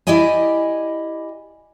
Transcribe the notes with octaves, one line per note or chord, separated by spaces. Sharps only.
E4 G4 D5 D#5 G#5